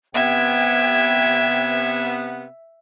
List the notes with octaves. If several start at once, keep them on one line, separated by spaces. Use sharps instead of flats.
C3 B3 E5 G5 G#6